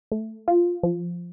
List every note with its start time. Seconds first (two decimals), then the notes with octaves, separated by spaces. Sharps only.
0.12 A3
0.48 F4
0.83 F3